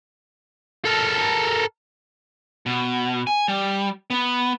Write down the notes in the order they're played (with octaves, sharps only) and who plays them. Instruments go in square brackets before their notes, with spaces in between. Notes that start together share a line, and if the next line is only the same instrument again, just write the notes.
[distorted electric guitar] A4 A#4
[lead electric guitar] B2
G#5
G3
B3